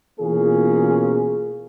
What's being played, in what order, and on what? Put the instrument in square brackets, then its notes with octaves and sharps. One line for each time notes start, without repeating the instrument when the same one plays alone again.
[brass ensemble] B2 E3 A#3 C#4 F4 G#4